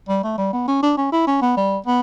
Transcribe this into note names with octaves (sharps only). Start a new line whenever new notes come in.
G3
A3
G3
B3
C#4
D4
C#4
E4
C#4
B3
G3
B3